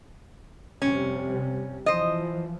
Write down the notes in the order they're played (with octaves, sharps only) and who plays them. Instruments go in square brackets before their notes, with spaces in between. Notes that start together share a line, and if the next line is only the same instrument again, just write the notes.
[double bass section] F2 C3 G3 [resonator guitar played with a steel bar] C#4
[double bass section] E3 F3 [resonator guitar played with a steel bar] C5 D#5